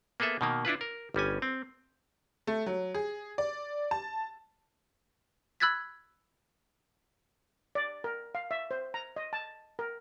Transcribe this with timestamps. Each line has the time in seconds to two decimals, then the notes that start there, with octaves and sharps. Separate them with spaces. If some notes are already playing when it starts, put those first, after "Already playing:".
0.20 A#3 B3 G#4 A4 E5
0.41 B2 D#3 A#3
0.65 D4 E4 F4 B4
0.81 A#4
1.14 G1 G3 C#4 G#5
1.42 C4
2.47 A3
2.66 F#3
2.94 G#4
3.38 D5
3.91 A5
5.60 B5 E6 F#6 G#6 A6 B6
7.75 D5
8.04 A#4
8.35 F5
8.51 E5
8.71 C5
8.94 A#5
9.16 D#5
9.33 A5
9.79 A#4